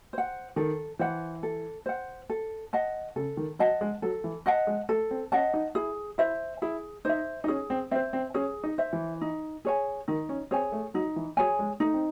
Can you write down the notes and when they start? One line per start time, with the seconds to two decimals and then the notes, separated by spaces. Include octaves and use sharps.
0.13 C5 F#5
0.56 D#3 A4
0.99 E3 C5 F#5
1.43 A4
1.86 C5 F#5
2.30 A4
2.73 D#5 F#5 A5
3.16 C#3 A4
3.37 D#3
3.59 F#3 D#5 F#5 A5
3.81 G#3
4.02 F#3 A4
4.24 E3
4.46 D#5 F#5 A5
4.67 G#3
4.89 A3 A4
5.11 C4
5.32 C#4 D#5 F#5 A5
5.54 D#4
5.75 E4 G#4
6.18 E4 C5 E5
6.62 E4 G#4
7.05 D#4 C5 E5
7.44 D#4
7.48 C#4 G#4
7.70 C4
7.91 C4 C5 E5
8.13 C4
8.34 C#4 G#4
8.64 D#4
8.78 C5 E5
8.93 E3
9.21 D#4
9.65 G#4 C#5 G#5
10.08 D#3 D#4
10.29 C#4
10.51 C4 G#4 C#5 G#5
10.72 A3
10.94 F#3 D#4
11.16 E3
11.37 F#3 G#4 C#5 G#5
11.59 G#3
11.80 A3 D#4
11.94 C4